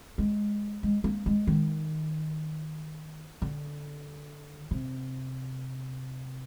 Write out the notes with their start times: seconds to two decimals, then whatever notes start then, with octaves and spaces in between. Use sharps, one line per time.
0.18 G#3
0.83 G#3
1.04 A#3
1.26 G#3
1.47 D#3
3.42 D3
4.71 C3